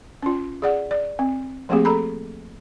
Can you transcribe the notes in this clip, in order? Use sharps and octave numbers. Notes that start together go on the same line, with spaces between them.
C#4 F4
G#4 D5 F#5
D5
C4
F3 A3 A#3 C4 G4 G#4
A4 A#5 B5